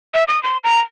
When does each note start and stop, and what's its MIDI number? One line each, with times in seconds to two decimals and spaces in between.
0.14 0.24 76
0.28 0.41 87
0.43 0.57 84
0.64 0.80 82